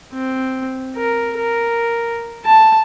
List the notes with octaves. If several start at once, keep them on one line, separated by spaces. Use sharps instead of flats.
C4
A#4
A#4
A5